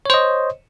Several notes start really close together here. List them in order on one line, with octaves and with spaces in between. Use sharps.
C#5 C5 D#5